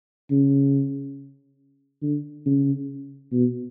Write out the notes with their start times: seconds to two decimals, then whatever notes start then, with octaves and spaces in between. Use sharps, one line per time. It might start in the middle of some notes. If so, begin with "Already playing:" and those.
0.31 C#3
2.02 D3
2.46 C#3
3.32 B2